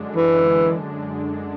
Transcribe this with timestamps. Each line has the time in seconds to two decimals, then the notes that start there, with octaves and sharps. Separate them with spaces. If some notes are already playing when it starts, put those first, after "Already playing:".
Already playing: F#2 D3 G#3 D4
0.16 E3